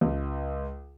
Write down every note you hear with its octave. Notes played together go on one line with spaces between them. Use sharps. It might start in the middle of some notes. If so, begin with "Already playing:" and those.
C#2